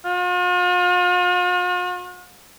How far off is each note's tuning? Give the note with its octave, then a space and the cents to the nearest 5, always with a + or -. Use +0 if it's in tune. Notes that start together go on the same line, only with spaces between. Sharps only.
F4 +45